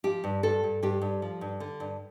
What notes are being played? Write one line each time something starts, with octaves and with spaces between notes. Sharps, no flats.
F3 G4
G2
G2 A4
G2
G2 G4
G2
F3
G2
D3
G2